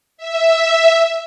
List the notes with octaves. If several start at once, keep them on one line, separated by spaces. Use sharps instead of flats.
E5